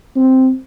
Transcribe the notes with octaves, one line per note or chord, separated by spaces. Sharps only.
C4